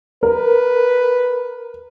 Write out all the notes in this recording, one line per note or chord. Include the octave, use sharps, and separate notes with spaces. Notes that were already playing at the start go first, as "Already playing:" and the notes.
A#4 B4